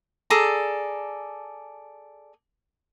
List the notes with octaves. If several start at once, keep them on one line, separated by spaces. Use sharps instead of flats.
G#4 A4 D5 A#5